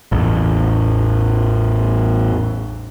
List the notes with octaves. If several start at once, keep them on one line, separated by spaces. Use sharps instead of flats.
A1 E2